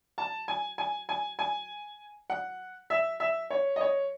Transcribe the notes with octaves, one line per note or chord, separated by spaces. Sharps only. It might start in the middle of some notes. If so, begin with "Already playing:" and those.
A5
G#5
G#5
G#5
G#5
F#5
E5
E5
C#5
D#5
C#5